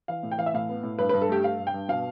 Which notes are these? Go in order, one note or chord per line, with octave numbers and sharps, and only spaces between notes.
E3 F5
A2
G5
E3 F5
E5
A2 F5
B3
A2
G2 B4
G2 B4
A4
A3 G4
G2 F5
G2
G5
G2
B2 F5